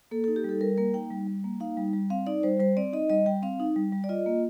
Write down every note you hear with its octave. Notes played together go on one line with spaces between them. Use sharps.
A#3 A4
A4
D#4
G4
G3 A4
G3 A#4
A#3 A#4
D#4 G5
G3
G3
A#3
D#4 F5
G3
G3
C4 F5
D#4 D5
G3 C5
G3 C5
C4 D5
D#4 D#5
G3 D#5
G3 G5
C4 F5
D#4
G3
G3
D5
F4 D#5
A#3